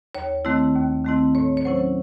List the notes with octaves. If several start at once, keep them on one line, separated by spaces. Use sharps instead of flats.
D#2 C#5
D#3 A3 C4 E4
D#2
D#3 A3 C4 E4
A2 C#5
C#5
F#3 C#4 E4 C5